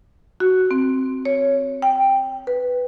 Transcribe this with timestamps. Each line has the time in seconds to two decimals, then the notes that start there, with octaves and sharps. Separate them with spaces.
0.40 F#4
0.71 C4
1.25 C#5
1.82 G5
2.47 B4